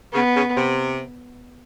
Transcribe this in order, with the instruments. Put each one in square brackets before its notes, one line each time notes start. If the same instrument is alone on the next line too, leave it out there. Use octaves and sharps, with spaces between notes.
[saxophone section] C#3 [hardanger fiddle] B3
[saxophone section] C#3
C3